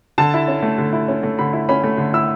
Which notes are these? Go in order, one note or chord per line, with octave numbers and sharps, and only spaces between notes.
D3 A5
E4
C#4
A3
D3
E4
C#4
A3
D3 B5
E4
C#4 B5
A3
D3
E4 E6